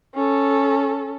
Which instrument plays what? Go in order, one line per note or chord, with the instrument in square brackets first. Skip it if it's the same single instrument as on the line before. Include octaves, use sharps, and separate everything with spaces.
[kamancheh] C#4 A4